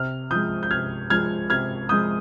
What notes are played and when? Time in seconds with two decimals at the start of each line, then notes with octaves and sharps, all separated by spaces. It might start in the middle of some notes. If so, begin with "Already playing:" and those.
Already playing: C3 F6
0.31 F3 G#3 D#6 G6
0.63 G6
0.71 C3 F6 G#6
1.10 F3 G#3 F6 G#6
1.50 C3 F6 G#6
1.89 F3 G#3 D#6 G6